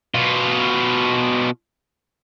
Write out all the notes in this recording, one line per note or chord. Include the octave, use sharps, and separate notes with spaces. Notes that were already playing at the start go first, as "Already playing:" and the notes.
B2 F4